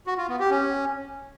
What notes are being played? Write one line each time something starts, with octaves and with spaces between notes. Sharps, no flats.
F#4
F4
B3
G4
C#4